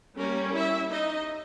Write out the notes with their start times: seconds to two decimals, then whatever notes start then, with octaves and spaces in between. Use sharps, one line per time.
0.17 G3 A#3 C#4 A#4
0.54 E4 E5
0.91 D#4 D#5